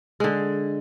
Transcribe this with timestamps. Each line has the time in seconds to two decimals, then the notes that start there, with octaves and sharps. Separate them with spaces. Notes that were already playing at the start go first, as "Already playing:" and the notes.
0.20 D3 G#3